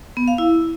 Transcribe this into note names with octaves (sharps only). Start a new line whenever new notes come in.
B3
F5
E4